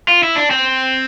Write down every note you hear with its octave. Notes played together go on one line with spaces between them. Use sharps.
F4
E4
D4
C4